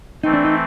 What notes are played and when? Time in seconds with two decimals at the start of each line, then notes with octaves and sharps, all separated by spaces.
0.24 E3 A3 C4 D#4
0.33 D4
0.45 D#4